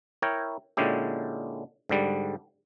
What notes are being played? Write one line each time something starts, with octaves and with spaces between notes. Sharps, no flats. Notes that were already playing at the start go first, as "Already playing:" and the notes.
E4 A#4 C#5 G5
A#2 D3 G#3 C#4 E4 G4
G#2 D3 G3